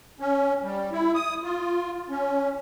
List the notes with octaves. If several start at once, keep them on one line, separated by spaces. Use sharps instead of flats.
C#4
G3
E4
D#6
F4
C#4